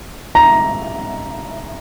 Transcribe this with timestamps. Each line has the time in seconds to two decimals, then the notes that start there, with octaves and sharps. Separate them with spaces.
0.35 A#5